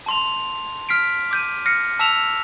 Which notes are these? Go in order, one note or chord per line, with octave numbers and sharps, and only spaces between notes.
A5 C6 F7
F6 B6 C7 D7
D6 G6 D#7
F6 A#6 C7 C#7
A5 E6 B6 E7 F7